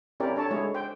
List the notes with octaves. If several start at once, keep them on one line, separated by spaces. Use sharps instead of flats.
C4 C#4 E4 G4 A#4 D5
D4 A4 C#5 A5
G#3 A3 E4 G#4 C#5
C5 G5